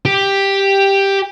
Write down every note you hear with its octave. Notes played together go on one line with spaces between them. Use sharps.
G4